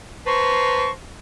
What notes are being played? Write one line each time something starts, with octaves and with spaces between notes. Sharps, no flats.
B4 C5 A5 A#5 C6 C#6